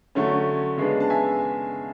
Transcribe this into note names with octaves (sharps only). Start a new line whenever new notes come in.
D3 F#3 A3 C#4
C#3 G#3 B3 D4
A5
E5 G#5